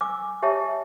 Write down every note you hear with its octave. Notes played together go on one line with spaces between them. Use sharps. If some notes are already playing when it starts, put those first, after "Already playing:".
G#5 D6 E6
G4 C#5 D#5 E5 G#5 A5